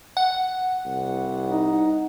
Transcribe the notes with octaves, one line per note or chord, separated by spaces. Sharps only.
F#5
C2
D#4